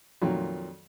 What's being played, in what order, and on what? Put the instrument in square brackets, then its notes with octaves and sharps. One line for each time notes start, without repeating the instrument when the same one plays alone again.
[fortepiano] F2 A#2 D#3 F#3